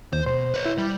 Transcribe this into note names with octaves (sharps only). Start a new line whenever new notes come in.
D#2 C5
B1 B2 C5
B4 C#5
E4
G3